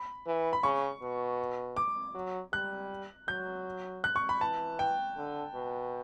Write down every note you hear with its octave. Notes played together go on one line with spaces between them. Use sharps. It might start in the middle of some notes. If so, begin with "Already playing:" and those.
Already playing: B5
E3
B5
C#3 C#6
B2
D6
F#3
G3 F#6
F#3 G6
F#6
C#6
B5
E3 A5
G5
D3
B2